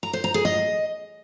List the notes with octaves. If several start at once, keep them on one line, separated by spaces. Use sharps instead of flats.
A#5
C5
A#5
G#4
D#5